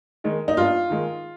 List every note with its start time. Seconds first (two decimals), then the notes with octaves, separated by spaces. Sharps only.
0.24 D#3 G#3
0.48 D#4
0.57 G2 F4
0.90 D#3 G#3